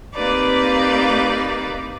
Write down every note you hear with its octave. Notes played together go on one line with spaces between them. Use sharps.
A#3 C4 D#4 G4 B4 D5